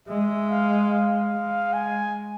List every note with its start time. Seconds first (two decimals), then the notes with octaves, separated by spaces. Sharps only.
0.08 G#3 E5
0.50 F5
0.91 F5
1.33 G#3
1.74 G#5